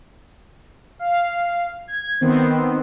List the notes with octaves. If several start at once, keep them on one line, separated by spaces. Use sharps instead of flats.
F5
G#6
D#3 B3 C4 C5